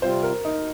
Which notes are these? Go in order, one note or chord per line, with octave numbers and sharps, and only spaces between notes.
C3 G3 C4 F4 C5
A#4
D#4